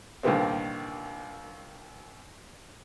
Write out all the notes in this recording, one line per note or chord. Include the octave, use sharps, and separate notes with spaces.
C2 A#2 D3 D#3 B3 C4